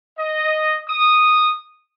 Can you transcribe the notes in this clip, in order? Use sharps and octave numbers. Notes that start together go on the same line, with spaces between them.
D#5
D#6